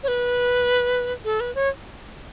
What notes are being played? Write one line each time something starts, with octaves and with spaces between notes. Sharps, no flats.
C#5
B4
A4
B4
C#5